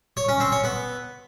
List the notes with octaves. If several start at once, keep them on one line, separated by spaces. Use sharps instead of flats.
C#5
C#4
C4
C#5
B3